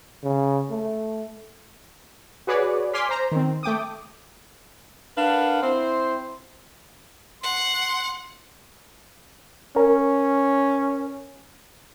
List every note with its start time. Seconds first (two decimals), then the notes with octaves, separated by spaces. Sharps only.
0.23 C#3
0.70 A3
2.47 F#4 G#4 B4 C#5 D5
2.94 G#5 C6 D6 F6 B6
3.09 C5 A#5
3.32 D#3 C4
3.63 A3 G5 D6 D#6
5.17 D4 A#4 B4 F5 F#5
5.62 C4 E4 C5
7.43 F#5 C6
9.76 C#4 A#4